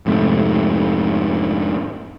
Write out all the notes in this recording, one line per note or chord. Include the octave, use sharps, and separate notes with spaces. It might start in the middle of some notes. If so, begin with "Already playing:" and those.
F2 G#2 C3 A3